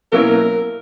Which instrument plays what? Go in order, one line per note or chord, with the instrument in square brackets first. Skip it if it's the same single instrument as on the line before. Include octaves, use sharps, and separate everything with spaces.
[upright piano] B2 F#3 A#3 C#4 E4 [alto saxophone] A#4